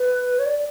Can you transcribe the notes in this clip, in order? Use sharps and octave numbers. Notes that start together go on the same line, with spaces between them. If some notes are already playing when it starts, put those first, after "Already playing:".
Already playing: B4
C#5
D5